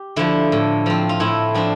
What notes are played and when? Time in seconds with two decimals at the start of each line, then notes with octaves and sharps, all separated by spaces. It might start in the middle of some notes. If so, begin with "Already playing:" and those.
Already playing: G4
0.16 D3 F3 E4
0.52 A2
0.86 F3 C4
1.09 F4
1.20 A2 E4
1.55 F3 C4 D4